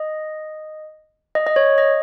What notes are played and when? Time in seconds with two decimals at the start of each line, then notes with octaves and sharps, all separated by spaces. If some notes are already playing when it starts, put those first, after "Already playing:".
Already playing: D#5
1.35 D#5
1.47 D#5
1.56 C#5
1.78 D#5